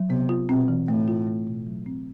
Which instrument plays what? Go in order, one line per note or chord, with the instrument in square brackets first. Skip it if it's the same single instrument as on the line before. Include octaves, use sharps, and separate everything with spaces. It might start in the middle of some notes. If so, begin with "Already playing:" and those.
Already playing: [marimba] F#3
[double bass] C3 [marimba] B3
[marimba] F4
[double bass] B2 [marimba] C4
[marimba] E3
[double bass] A2 [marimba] A3
[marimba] F4
A3
B2
F#3
C4